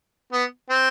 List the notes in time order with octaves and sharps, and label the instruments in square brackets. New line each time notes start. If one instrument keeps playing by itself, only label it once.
[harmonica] B3
C4